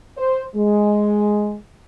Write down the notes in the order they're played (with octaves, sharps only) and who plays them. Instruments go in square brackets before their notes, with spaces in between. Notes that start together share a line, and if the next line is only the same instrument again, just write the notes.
[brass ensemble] C5
G#3